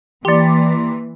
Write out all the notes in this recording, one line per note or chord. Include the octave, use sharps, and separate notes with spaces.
E3 A#3 G4 D5 C6